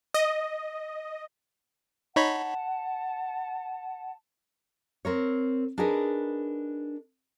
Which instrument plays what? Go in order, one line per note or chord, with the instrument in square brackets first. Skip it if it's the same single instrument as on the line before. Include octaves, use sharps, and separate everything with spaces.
[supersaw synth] D#5
[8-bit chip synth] D#4 C#5 B5 [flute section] F#5 A5
[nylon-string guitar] C4 A#4 C#5
D4 D#4 G#4 A#4 B4